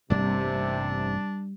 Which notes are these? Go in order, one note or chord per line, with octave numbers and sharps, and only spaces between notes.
A1 G2 C3 G3 A#3 D4